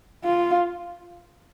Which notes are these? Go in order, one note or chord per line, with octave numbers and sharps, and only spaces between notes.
F4